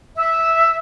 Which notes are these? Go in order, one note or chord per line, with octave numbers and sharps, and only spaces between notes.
E5